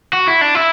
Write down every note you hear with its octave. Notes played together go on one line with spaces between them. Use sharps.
F#4
E4
D4
E4